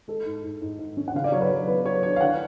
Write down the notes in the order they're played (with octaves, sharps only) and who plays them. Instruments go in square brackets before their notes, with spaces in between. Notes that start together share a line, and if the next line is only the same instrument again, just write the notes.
[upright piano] G#3 A4
G#2
G#2
G#2
G#2
C#4
F#5
C#3 F5
D5
F#3 C#5
B4
F#3
B3 B4
F#3 C#5
D4 C#5
F5
D3 F#5